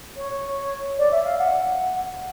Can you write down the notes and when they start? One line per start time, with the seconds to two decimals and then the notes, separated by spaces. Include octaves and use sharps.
0.17 C#5
0.98 D5
1.11 E5
1.25 F5
1.38 F#5